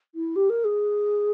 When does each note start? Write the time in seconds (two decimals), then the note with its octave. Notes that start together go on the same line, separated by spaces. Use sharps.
0.15 E4
0.36 G4
0.50 A#4
0.64 G#4